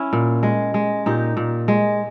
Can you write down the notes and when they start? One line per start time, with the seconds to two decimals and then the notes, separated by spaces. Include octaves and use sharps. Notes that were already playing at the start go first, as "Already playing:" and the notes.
Already playing: C#4 E4
0.13 A#2
0.43 G#3
0.74 G#3
1.06 A#2 D#4 G4
1.37 A#2
1.68 G#3